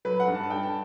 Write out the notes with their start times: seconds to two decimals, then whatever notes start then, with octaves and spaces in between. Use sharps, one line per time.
0.05 F#3 B4
0.20 F#5
0.28 G2
0.35 A5
0.50 G2 G5
0.63 A5